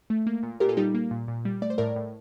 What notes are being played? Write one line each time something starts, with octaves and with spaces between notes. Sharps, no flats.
A3
A#3
A#2
A#2 G4 A#4
F4 A4
G3 D#4 G4
A#3
A#2
A#2
G3
A3 D5
C5
A2 A#4 D5
A2